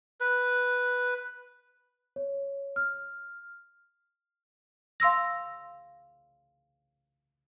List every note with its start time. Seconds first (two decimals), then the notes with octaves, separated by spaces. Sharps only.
0.21 B4
2.16 C#5
2.76 F6
5.00 F5 C6 E6 A#6